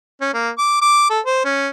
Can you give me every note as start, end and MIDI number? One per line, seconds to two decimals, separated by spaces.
0.21 0.29 61
0.34 0.50 58
0.58 0.78 86
0.81 1.08 86
1.10 1.20 69
1.26 1.43 72
1.45 1.69 61